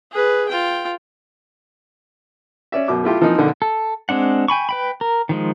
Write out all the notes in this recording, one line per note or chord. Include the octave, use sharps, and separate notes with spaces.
G#4 B4
F4 G5
C#4 D5 E5
F#2 B2 D6
A3 E4 F4 G4
E3 F3 A#3 C4 D#4
B1 D3 D#3
A4
G#3 C4 D4 F#5
G5 G#5 B5 C#6
B4 G5 B5
A#4
D#3 F3 G#3